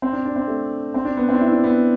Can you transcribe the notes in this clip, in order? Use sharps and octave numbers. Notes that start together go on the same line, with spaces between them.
C4
D4
D4
C4
A3
C4
D4
B3
C4
D4
E4
D4
B3